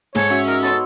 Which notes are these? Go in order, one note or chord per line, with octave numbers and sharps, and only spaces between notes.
G#2 A4 C#5 A5
C#4 F#4 E5
D#4 A#4 E6
B3 A4 C#5 C6